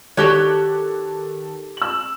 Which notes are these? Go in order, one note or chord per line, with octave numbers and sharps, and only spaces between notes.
D#3 F#4 G4 A4 C#5 F#6
E6 F#7